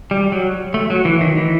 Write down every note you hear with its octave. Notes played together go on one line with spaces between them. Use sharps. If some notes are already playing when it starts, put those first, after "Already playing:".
G3
F#3
A3
F#3
E3
D#3
E3